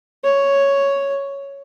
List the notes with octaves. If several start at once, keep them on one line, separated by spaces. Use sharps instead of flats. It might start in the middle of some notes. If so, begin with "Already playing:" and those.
C#5